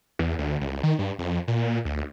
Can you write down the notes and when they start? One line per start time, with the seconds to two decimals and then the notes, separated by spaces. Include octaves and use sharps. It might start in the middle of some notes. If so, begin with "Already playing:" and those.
0.19 E2
0.38 D2
0.61 C#2
0.83 D#3
0.99 G2
1.19 F2
1.48 A#2
1.85 D2